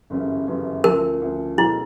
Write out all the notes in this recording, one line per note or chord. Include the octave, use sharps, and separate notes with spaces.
G1 F#2 C#3 E3 G3
G1 F#2 C#3 E3 G3
D2 C#3 F3 A#4
D2 C#3 F3
B2 G#3 C#4 E4 F#4 A4